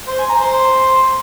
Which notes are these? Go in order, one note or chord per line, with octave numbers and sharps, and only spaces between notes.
C5
G#5
A#5
C5